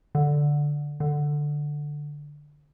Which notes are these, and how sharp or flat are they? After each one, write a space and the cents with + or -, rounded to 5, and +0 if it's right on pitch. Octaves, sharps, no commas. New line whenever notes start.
D3 +0
D3 +5